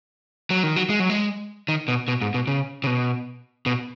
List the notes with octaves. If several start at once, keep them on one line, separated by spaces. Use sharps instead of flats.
F#3
D#3
F#3
G#3
F#3
G#3
D#3
B2
B2
G#2
B2
C#3
C#3
B2
B2